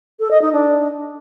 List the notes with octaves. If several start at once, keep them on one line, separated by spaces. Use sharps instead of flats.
A4
D#5
D#4
D4